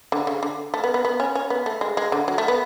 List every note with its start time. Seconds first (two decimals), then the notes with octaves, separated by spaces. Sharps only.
0.12 D3
0.27 C#3
0.43 D3
0.74 A3
0.84 B3
0.94 B3
1.05 B3
1.20 C#4
1.35 C#4
1.50 B3
1.66 A3
1.81 G#3
1.97 G#3
2.12 D3
2.28 F#3
2.38 A3
2.48 B3